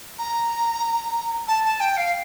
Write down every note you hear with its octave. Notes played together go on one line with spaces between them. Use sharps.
A#5
A5
A5
G5
F5